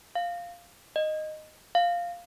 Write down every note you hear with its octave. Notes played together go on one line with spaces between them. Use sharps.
F5
D#5
F5